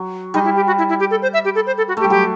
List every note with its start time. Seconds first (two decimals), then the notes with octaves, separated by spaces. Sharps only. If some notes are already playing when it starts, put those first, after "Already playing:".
Already playing: F#3
0.34 G3 D#4
0.45 E4
0.56 G4
0.67 F#4
0.78 E4
0.89 E4
1.00 G4
1.11 A4
1.22 C5
1.34 E5
1.45 G4
1.55 A4
1.67 C5
1.77 A4
1.88 F#4
1.97 A3 G4
2.04 G3
2.10 F#3 G4